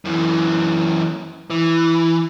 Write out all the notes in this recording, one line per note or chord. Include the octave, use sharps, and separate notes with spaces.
F#2 E3
E3